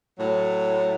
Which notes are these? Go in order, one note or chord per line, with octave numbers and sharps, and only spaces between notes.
A2 F#3